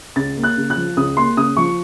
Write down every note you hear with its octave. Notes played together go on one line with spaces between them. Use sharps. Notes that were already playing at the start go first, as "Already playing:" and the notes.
C#2 A6
A#3
F#6
C#3
F#6
F3
C#2 D#6
A#3 C6
C#3 D#6
F3 C#6